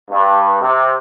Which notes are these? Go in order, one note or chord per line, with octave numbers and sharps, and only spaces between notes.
G2
C3